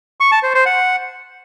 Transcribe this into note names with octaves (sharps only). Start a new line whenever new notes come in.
C#6
A5
C5
C5
F#5